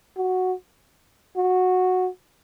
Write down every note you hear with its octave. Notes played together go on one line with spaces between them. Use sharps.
F#4
F#4